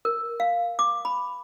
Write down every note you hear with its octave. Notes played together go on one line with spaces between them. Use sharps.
A#4
F5
D6
B5